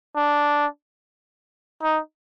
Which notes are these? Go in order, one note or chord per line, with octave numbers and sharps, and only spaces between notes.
D4
D#4